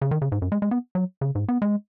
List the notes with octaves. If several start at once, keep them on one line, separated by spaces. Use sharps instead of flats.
C#3
D#3
C#3
G#2
F#2
G#3
G#3
B3
F#3
C#3
G#2
B3
G#3